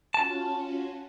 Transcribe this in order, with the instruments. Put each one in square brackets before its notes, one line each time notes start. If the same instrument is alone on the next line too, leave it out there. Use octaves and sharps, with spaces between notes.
[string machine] C#4 F4 F#4 [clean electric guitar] A5